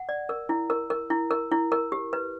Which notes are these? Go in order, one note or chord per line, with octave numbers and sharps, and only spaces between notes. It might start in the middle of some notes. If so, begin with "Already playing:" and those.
Already playing: F#5
D5
A#4
E4
A#4
A#4
E4
A#4
E4
A#4
G4
B4